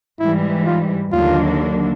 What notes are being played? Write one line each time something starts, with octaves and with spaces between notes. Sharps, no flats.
G#2 E3 G3 E4
F4
D#2 D3 F#3 A#3 D4 F4